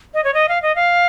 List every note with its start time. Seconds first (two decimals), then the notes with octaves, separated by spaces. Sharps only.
0.14 D#5
0.24 C#5
0.34 D#5
0.49 F5
0.62 D#5
0.76 F5